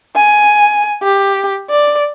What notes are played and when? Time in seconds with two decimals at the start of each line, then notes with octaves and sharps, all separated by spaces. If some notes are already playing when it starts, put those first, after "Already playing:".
0.16 G#5
1.03 G4
1.70 D5